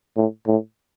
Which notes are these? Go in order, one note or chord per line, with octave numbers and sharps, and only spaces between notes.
A2
A2